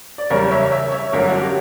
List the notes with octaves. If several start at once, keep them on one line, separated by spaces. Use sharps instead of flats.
D5
F#1 E2 C#3 G3 A#4 C#5
C#5 E5
C#5 E5
C#5 E5
G1 F#2 D3 F#3 C#4 A#4 C#5
F#4
G4